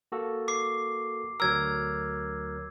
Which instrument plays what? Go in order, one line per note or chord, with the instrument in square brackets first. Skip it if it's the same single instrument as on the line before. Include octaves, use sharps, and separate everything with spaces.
[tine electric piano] A#3 F#4 A4
[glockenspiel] D6 C7
[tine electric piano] D2 F#3 A#4 [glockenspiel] E6 G#6